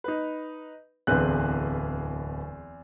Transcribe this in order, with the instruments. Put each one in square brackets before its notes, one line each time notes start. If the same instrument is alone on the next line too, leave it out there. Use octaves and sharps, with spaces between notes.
[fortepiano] D#4 B4
[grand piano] D1 B4 F#6 [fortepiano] E2 C4 G#4